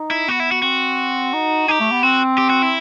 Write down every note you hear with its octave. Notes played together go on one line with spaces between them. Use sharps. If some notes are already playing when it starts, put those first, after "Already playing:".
Already playing: D#4
E4
B3 F#4
E4
F#4
C4 F#4
D#4
D#4 G4
A3
B3
C4 F#4
G4
F#4
E4